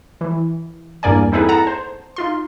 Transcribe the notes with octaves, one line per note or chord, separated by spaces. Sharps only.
E3
E2 G2 A#3 D5 G#5
C4 D#4 E4 G#4 A4 B4
F#5 A5 A#5
C5
D#4 F4 C6